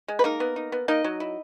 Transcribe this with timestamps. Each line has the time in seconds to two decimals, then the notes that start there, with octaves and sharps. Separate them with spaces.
0.08 G#3
0.19 B4
0.24 A#3 D#4 A#4
0.40 B3
0.56 D#4
0.72 B3
0.88 A#3 D#4 D#5
1.04 F#3
1.20 E4